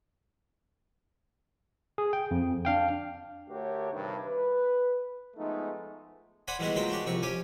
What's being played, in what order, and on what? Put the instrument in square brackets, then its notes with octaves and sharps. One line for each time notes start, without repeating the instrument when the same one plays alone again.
[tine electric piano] G#4
G5
F2
D4 F5 G5
[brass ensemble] D3 A3 F#4 G4 A#4 C#5
G2 C3 D#3
B4
F3 G#3 A3 B3 D#4
[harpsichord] C5 D5 F#5 G#5 B5
E3 G3 G#3 B3 F#4 G#4
C#2 F#3 A#3 F#4 C5 G5
D4 F#4 G4 D5
C2 F2 C4 C#6
C#4 G4 G#5 D6